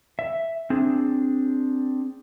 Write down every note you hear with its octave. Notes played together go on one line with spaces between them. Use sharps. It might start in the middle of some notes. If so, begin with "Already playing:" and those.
E5
C4 D4 G#4